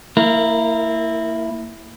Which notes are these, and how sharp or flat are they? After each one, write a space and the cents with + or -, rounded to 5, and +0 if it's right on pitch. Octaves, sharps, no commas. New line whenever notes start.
A#3 -30 E4 +0 A#4 +0